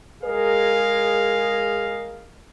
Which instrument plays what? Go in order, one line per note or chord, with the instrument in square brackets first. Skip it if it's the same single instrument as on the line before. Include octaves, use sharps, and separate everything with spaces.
[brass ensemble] G#3 G#4 A#4 D#5 F5